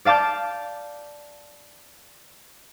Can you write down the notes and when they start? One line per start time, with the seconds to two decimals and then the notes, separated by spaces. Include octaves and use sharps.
0.05 D5 F5 A5 D6 G6